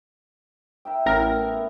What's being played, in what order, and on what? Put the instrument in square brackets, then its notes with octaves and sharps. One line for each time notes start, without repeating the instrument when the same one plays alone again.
[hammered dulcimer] A#4 E5 G5
[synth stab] A1 A#4 [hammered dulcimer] A2 B3 E4